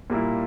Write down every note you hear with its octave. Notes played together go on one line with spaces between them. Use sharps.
A#2 G3 A#3 E4